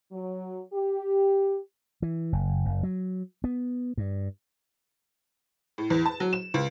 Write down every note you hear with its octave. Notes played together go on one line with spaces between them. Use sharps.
F#3
G4
E3
F#1
F#1
F#3
B3
G2
A2
E2
A5
F#3
E7
C#2